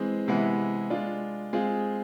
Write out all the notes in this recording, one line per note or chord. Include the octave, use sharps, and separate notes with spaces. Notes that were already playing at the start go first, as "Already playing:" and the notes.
Already playing: E3 G#3 C4 G#4
C3 E3 G#3 B3 E4
G#3 D4 F4
G#3 C4 F4 G#4